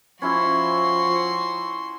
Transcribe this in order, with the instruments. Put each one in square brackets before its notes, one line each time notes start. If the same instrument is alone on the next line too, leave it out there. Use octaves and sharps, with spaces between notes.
[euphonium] F3 [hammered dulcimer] C#4 E4 E5 [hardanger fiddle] F#4 C6